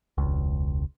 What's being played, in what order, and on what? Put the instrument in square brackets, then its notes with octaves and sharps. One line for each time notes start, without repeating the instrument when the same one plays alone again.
[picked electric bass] E1 C#2